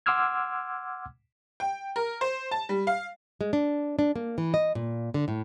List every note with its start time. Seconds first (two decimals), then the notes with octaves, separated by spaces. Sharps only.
0.06 F#5 C6 D6 E6 F6 G#6
1.60 G5
1.96 A#4
2.21 C5
2.51 A5
2.69 G3
2.87 F5
3.41 G#3
3.53 D4
3.99 D4
4.16 A#3
4.38 E3
4.54 D#5
4.75 A#2
5.14 D3
5.28 A2